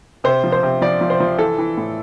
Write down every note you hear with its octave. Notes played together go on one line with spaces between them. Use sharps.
C3 C5
F3
C5
C3
F3 D5
F3
C5
F3
E3 A4
E3
A2